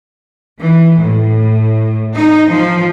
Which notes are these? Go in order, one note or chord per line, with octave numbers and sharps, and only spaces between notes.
E3
A2
D#4
F3